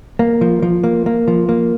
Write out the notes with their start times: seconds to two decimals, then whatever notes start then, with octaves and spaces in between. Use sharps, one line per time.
0.19 A#3
0.41 F3
0.62 F3
0.84 A#3
1.06 A#3
1.28 F3
1.49 A#3